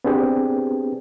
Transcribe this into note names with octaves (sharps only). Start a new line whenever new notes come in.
B3 C4 D4 G4 G#4 B4